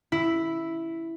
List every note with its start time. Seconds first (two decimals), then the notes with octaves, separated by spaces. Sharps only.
0.12 E4